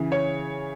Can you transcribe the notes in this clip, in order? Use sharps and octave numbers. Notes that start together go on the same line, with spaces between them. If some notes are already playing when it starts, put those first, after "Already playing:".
Already playing: C#3 E3
C#5